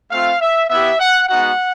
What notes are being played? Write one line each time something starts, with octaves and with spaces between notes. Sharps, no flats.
A3 C4 F4 F5
E5
B3 E4 G4 E5
F#5
G#3 B3 D#4 F#4 F#5